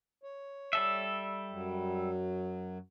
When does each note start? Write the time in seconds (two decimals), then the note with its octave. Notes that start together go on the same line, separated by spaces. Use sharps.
0.23 C#5
0.73 G3 A4 E5
1.51 F#2 F#3